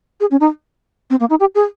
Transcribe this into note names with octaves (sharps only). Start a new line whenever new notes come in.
G#4
C#4
D#4
C4
A#3
D#4
G4
G#4